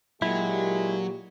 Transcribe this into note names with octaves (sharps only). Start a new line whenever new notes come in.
A#2 F#3 G#3 E4 G4